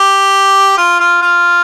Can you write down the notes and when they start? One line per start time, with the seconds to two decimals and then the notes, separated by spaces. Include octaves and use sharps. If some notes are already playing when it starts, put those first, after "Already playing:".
Already playing: G4
0.78 F4
1.00 F4
1.22 F4